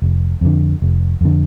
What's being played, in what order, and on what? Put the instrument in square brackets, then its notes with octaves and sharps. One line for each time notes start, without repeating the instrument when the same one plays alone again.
[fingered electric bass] F1
F2 D3
F1
F2 D3